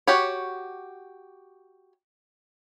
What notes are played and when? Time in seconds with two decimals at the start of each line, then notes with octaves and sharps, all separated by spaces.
0.07 F#4 G4 C#5